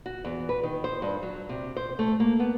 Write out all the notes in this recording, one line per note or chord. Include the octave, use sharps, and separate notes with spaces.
F#4
E2
B4
D#3
C5
G2
F#3
C3
C5
A3
A#3
B3